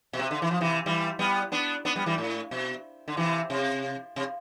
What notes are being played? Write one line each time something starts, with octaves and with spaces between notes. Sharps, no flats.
B2
C3
D3
E3
F3
C3 E3
E3 G3
G3 B3
B3 D4
B3 D4
G3 B3
E3 G3
A2
B2
D3
C3 E3
C3
C3